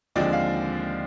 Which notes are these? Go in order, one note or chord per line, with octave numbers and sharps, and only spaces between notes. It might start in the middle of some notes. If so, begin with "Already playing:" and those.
D#2 D3 F3 G#3 C4 D5
F5